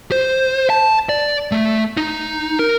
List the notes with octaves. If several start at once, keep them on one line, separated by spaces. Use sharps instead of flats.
C5
A5
D5
A3
D#4
A#4